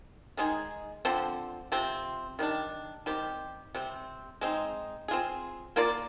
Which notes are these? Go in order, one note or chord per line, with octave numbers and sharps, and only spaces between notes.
D#3 G#3 D#4 G#4
D3 F3 C4
C3 F3 C4
D#3 G3 D4
D#3 G3 C4 G4
C3 G3 C4
G#3 C4 D#4
C4 F4 G#4
A#3 F4 A#4 D5